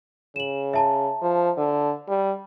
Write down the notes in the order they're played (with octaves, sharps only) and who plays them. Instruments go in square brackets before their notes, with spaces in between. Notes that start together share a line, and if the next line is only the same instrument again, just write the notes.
[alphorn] C#3 [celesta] E7 F#7
[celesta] E5 A5 A#5
[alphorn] F3
D3
G3